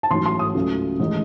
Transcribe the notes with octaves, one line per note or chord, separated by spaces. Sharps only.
A5
A1 G#2 F#3 C6
C6
D#6
C#2 C#3 F#3 A3
A1 D#3 G#3 D#4